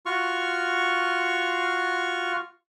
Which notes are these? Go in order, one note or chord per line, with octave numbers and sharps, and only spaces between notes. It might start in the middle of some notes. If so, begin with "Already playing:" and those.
F4 F#4 C#6 F6